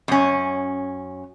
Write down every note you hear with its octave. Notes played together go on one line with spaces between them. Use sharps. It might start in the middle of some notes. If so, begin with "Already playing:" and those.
F#2 C#4